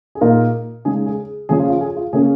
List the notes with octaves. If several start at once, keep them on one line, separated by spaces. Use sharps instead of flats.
G#4
A#2 A#3 D#4 F4 A#4
C#3 G#3 D#4 G#4
G#4
C#3 F3 C#4 G#4
F4
F4
G#4
F4
C#3 A#3 C#4 G#4